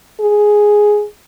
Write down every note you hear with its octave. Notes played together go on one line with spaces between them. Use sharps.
G#4